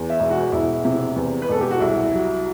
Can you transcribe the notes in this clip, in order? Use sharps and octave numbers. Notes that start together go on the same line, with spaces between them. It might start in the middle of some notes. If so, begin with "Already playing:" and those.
Already playing: E2
E5
E1
F#4
E1 E4
C3
E2
B4
E1 A4
G4
F#4
C2 E4
F#3